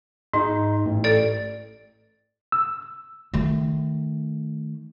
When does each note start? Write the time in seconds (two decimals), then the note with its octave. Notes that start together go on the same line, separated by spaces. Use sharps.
0.33 G#2 D#4
0.85 A1
1.04 A4 D5
2.52 E6
3.34 D#3 A3